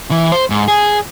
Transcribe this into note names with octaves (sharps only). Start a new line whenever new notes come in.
E3
C5
G#2
G#4